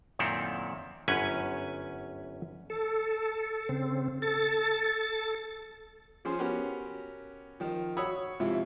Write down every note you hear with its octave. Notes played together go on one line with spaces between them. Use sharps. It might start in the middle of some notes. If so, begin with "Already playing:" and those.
F#2 A#2 D#3 C4 E4 A4
G1 F#2 C#4 G4 B4 G#5
A4
C#3 C4
A4 A6
F3 C#4 G#4 C5 C6
B3 C#4 F#4 G4 A#4
D#3 F3
F#4 C#5 B5 C#6 D#6 E6
G#2 C3 F3 E4 F4